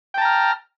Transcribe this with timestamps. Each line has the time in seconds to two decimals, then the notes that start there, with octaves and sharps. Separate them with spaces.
0.14 G5
0.18 A5
0.21 A#5
0.25 F6